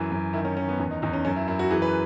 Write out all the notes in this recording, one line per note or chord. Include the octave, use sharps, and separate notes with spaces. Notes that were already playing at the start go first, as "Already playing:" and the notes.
Already playing: F#2 E3
F#2
D#3 E4
C#4
D#3 C#4
B3
E2 C#4
D#4
E2 D#4
C#4
F#2 C#4
E4
F#2 E4
F#4
E3 G#4
B4